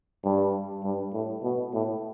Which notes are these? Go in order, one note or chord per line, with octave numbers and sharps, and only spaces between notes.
G2
G2
A2
B2
A2